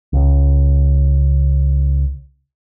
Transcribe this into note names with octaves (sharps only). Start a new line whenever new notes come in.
C#2 C#3